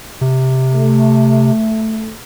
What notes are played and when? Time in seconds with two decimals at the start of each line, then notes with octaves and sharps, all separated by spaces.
0.21 C3
0.74 A3